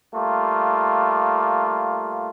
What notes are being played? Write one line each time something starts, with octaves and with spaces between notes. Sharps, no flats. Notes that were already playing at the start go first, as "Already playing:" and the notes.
G3 A3 A#3 F4